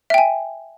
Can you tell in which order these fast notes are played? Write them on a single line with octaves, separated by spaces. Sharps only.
E5 G5 G#5